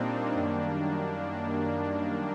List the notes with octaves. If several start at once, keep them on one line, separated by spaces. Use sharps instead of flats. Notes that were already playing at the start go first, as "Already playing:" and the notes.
Already playing: A#2 G3 A#3 C4 D4 D#4
F#2 D#3 G3